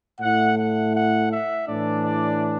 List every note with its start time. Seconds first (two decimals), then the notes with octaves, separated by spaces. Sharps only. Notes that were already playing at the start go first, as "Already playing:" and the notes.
0.21 A2 A3 E4 F#5
0.57 F#5
0.94 F#5
1.31 E5
1.67 A2 E3 D4 D5
2.04 D5